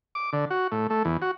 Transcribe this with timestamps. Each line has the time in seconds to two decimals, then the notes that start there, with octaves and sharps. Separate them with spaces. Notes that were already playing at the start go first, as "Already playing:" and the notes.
0.15 D6
0.33 D3
0.50 F#4
0.72 A2
0.90 A3
1.05 E2
1.22 F#4